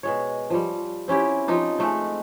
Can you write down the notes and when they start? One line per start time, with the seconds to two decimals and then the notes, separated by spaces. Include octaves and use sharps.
0.03 B2 G#3 C#5
0.50 F3 G3
1.08 C4 C#4 E4 G4
1.48 F3 D#4 F4 G4
1.78 G#3 A3 C4